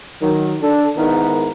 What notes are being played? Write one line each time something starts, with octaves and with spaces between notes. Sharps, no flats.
D#3 F#3
D4 A4
G#2 D#3 B3 D#4 E4 A#4